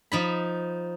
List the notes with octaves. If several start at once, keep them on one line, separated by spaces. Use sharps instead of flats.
F3 D#4 B5